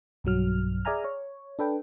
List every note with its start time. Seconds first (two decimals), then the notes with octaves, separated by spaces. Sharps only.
0.24 B1 G2 F#3 F6
0.85 G#4 D5 E5 G#5 A#5 F6
1.04 C#5
1.59 D4 A4 B4 G5